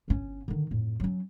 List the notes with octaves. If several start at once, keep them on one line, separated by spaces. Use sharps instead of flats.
G1 C#4
D3 D#3
F2 A2
F#3 C#4